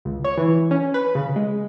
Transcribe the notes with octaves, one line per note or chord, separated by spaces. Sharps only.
C#2
C#5
E3
C#4
B4
C#3
G#3